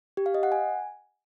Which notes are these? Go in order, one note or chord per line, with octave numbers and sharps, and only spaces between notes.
G4
F5
D#5
F#5
G#5